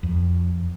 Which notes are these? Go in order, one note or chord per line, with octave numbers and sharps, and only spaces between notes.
F2